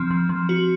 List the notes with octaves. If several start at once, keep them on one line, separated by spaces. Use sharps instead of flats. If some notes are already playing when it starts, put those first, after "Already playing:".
Already playing: F3 C4
F3
F3
F#4